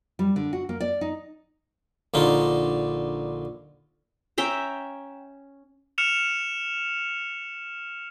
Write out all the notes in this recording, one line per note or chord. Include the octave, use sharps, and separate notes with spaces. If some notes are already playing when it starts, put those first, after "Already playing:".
G3
D3
F#4
A#3
D5
D#4
A#1 D3 D#4 F4
C#4 E5 G5 A#5
F6 C#7 E7 F7